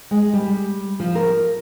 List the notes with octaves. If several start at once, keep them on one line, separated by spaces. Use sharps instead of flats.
G#3
G3
F3
A#4